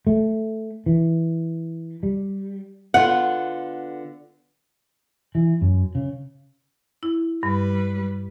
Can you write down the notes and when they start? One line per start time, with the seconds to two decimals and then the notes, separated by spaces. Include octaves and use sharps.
0.07 A3
0.86 E3
2.03 G3
2.94 D3 B3 F4 F#5
5.35 E3
5.61 F#2
5.95 C#3
7.03 E4
7.43 G2 G3 B4